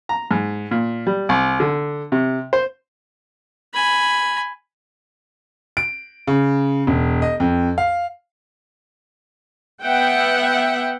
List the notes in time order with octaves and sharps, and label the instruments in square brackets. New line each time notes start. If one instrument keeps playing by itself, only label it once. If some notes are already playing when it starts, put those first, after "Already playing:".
[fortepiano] A#5
G#2
A#2
G3
C2
D3
C3
C5
[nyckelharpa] G#5 B5
[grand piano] D7
C#3
E1
D#5
F2
F5
[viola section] B3 E5 F#5 G5